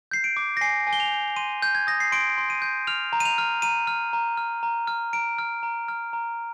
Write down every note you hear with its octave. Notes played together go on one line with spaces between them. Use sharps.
G6 C7
D7
D6
A#6
G#5 C7
G#5
G7
F7
G6
C6 D#7
G6
G#6
D#6 A#6
C7
C6 D7
C6
D#7
G6
F6 F7
A#5
D#7
F7
F6
A#5 D#7
F6
A#5
F6
A#5
F6
A#5 D7
F6
A#5
F6
A#5